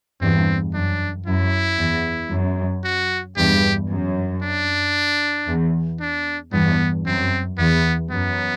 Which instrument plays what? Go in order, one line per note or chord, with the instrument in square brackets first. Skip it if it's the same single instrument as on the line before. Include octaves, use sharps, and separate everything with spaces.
[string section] E2 G2 [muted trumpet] C4
[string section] F#2 [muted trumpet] D4
[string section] F#2 [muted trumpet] E4
[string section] E2
F#2
[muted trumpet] F#4
[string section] E2 G2 [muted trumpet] G4
[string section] F#2
[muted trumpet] D4
[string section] E2
[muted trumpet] D4
[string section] E2 G2 [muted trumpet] B3
[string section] F#2 [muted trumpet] C4
[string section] E2 [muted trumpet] B3
[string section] F#2 [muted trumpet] B3